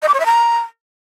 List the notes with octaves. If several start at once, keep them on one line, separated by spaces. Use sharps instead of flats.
D#5
D6
C#5
E5
A#5